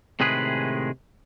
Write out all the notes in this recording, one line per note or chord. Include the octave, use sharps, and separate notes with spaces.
A2 C3 D#3 G#3 G#4 B4